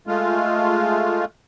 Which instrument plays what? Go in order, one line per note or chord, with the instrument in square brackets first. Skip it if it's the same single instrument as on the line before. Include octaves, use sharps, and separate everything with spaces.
[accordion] G#3 A3 F4